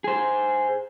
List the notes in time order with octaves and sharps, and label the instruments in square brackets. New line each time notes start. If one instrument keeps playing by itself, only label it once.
[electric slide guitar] G#4 C5